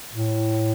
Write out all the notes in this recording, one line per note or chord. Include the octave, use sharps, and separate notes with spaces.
A2